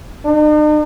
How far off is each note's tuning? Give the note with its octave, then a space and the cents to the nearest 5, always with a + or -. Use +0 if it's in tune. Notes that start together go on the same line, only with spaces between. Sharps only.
D#4 -45